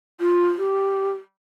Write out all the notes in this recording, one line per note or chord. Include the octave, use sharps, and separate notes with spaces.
F4
G4